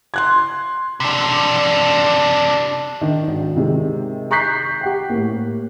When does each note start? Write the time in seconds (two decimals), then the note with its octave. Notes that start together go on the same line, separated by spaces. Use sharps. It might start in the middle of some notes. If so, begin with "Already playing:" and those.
0.14 C6 F#6 G#6
1.00 C3 D4
3.01 D#3 D4
3.28 G#1
3.56 C3 D#3 G#3
4.31 A#5 C#6 F#6 G6 B6 C7
4.81 G4 F#5 G5
5.10 A2 A#3